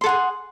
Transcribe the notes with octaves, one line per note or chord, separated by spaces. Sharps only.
G#4 A4 F#5 C6